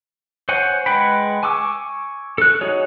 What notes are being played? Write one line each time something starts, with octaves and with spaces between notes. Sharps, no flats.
C5 C#5 F#5 G#5
G#3 B4 F#5 G5 B5
G#5 C#6 D6 E6
A4 F#6
D#4 F#4 G#4 C#5